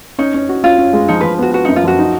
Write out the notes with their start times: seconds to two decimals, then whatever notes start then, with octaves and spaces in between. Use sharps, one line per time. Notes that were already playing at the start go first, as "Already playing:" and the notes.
0.18 C#4 D#4
0.34 C#4
0.49 F#4
0.64 C#4 F4
0.78 C#4
0.93 G#3
1.08 F3 D#4
1.21 F3 B4
1.39 B3 F#4
1.54 B3 F#4
1.65 F#2 D#4
1.76 F4
1.83 F3 F#4
1.99 D#4